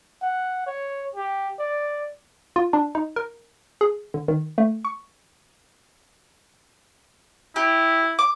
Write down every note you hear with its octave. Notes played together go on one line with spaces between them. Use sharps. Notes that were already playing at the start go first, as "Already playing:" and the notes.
F#5
C#5
G4
D5
F4
D4
D#4
A#4
G#4
D3
D#3
A3
C#6
E4 G4
D6